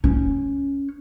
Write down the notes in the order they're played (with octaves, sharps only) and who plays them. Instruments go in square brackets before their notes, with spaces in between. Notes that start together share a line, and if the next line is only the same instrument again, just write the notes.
[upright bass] C#4